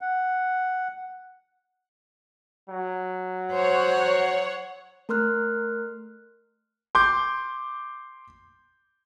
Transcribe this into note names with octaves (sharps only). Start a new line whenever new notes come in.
F#5
F#3
C5 C#5 F#5
A3 A#4 C6 F6 F#6
C6 D6 G6